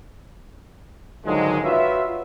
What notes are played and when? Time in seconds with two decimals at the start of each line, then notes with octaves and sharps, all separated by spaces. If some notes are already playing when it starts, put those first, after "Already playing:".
1.26 G#2 D3 D#3 F3 F#3 G#3
1.63 F4 F#4 B4 C#5 E5